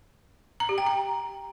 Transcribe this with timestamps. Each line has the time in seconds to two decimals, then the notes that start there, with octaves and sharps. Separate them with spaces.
0.60 A#5
0.69 G4
0.78 G5
0.87 A#5